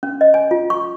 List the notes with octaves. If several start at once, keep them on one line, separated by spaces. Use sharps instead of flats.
C#4
D#5
G#5
F4
C#6